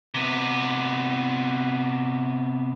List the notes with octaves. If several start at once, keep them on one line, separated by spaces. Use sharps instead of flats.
C3 B3